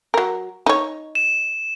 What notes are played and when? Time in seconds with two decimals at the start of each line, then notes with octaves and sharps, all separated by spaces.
0.14 F#3 A#4
0.66 D#4 C#5
1.15 E7